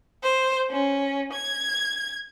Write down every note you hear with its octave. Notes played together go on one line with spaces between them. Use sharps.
C5
C#4
G#6